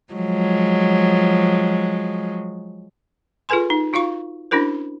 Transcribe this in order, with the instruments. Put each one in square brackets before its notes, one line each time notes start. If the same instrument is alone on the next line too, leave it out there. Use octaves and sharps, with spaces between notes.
[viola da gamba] F3 F#3 G#3
[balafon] F4 G#4 A4 B4 G#5 C6
D#4
D#4 F4 F#4 F5 C#6
C#4 D4 E4 F#4 A#4 C5